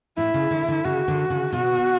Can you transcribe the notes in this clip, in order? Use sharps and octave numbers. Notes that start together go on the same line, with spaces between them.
A2 E4
C#3
D3
D3
C#3 F#4
D3
C#3
B2 F#4